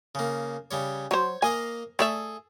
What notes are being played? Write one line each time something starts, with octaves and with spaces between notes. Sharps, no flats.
C#3 A#3
C#3 G3 C#5
F#3 C5 C#5
A#3 D#5 F5 G#5
A3 G#4 A4 D5 E5